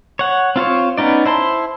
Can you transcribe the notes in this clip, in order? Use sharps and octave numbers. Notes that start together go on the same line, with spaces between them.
C#5 F#5
C4 F4 C5 C#5
B3 C#4 D#4 D5
E4 C5 A5 C6